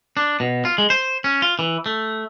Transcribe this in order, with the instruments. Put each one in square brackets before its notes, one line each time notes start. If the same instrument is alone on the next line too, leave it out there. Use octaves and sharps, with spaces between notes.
[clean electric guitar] D4
B2
F4
G#3
C5
C#4
F4
E3
A3